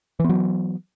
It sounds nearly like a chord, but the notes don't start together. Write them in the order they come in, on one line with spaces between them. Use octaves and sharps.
E3 B3 F#3